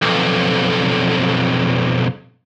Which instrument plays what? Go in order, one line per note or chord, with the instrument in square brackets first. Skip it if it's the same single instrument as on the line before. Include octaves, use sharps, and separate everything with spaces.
[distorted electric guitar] B1 F2